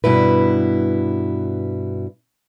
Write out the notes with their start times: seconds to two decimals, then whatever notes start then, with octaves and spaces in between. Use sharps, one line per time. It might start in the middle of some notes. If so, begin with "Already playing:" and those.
0.04 G2 B2 E4 B4